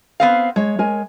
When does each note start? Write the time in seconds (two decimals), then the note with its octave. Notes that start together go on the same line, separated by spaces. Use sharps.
0.20 B3 C4 F5
0.56 G#3 C#5
0.79 G#3 A#4 G#5